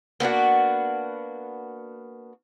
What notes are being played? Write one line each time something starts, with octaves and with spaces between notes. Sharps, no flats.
A#3 B3 D4 F#4